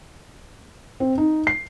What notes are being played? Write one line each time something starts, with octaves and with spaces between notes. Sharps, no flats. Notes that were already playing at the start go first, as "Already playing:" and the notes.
C4
D#4
C7